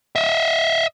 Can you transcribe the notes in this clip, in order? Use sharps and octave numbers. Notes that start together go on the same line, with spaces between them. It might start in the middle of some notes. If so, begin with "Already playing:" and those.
D#5 E5